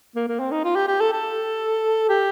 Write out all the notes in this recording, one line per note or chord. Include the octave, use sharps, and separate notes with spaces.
A#3
A#3
C4
D#4
F4
G4
G4
A4
A4
G4